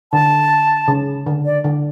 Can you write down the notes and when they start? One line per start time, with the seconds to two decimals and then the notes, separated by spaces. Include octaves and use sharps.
0.12 D3 A5
0.88 C#3
1.26 D3
1.46 D5
1.64 D3